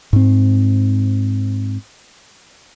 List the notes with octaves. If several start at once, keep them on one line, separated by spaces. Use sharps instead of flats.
G#2 C4